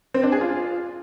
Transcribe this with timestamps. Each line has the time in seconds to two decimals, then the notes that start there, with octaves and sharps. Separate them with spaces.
0.14 C4
0.23 D4
0.32 G#4
0.41 F4